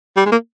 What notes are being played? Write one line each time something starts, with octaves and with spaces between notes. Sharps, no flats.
G3
G#3
A#3